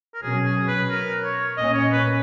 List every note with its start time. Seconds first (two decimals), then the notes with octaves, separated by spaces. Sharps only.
0.14 A#4
0.23 B2 F#3 C#4 G#4
0.45 G#4
0.68 B4
0.90 A#4
1.24 C#5
1.57 A#2 A#3 C#4 D#5
1.74 C#5
1.91 B4